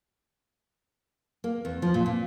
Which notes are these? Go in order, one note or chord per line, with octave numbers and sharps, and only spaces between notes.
A#3
E2
F3
A#2
A#2